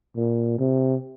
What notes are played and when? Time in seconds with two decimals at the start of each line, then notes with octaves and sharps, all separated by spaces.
0.16 A#2
0.59 C3